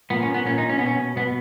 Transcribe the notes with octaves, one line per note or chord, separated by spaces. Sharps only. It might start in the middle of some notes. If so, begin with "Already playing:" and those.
A#2 B3
C#4
B3
A#2 C#4
D#4
C#4
B3
B2 C#4
B2 B3